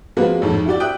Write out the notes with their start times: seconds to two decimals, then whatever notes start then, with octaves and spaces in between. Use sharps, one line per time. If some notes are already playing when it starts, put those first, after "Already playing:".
0.17 F3 G#3 A#3 C4 F#4 B4
0.42 A1 F2 G#2
0.66 E4 F#4 G4 D5
0.80 E5 G5 D#6 F#6